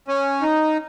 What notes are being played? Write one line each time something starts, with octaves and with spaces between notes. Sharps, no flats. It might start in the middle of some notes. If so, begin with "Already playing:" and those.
C#4
D#4